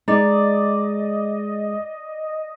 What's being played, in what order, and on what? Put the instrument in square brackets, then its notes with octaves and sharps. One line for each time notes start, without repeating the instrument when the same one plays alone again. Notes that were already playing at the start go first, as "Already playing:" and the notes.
[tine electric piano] G#3 G#4 [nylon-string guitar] D#4 [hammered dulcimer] D5 [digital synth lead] D#5